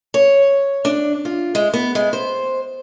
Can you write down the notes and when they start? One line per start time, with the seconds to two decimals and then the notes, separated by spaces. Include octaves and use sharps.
0.14 C#5
0.85 D4
1.25 F4
1.55 G#3
1.74 B3
1.95 G#3
2.13 C5